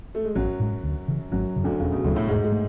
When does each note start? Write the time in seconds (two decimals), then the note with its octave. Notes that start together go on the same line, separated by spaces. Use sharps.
0.15 A3
0.25 G#3
0.35 A1 F#2 F#3
0.60 A2 G#3
0.84 D2
1.08 C#3 E3
1.32 G#1 F#2 F#3
1.56 F#2 C#3
1.64 D2 D3
1.80 E1 C#3
1.92 B2
2.04 D2 A2 C#3 F#3 A3
2.16 A2 A3
2.28 E1 G#2 G#3
2.44 G#3
2.52 A3